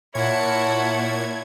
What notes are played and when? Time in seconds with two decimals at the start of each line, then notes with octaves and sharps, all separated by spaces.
0.15 A#2 E4 A#4 C#5 F#5 A5 G#6